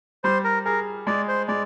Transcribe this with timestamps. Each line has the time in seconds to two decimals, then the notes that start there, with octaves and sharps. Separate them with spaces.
0.24 G3 C5
0.44 A#4
0.65 G#4 A#4
1.07 G#3 D5
1.28 C5
1.48 G#3 D5